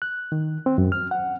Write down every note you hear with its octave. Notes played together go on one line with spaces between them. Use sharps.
F#6
D#3
C4
F#2
F6
F#5